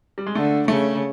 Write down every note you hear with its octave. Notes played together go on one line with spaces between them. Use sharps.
G3
G#3
D3 A3
C#3 A3